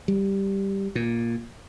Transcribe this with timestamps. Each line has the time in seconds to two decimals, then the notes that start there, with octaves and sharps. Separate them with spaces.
0.08 G3
0.95 A#2